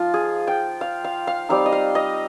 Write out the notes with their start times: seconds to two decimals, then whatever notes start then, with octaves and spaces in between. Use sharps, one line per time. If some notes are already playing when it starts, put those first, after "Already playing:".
Already playing: F3 D#4 F4
0.14 G#4
0.47 G5
0.81 F5
1.04 F5
1.27 F5
1.49 G3 C4 D#4 F5
1.66 D#5
1.72 F5
1.95 D#5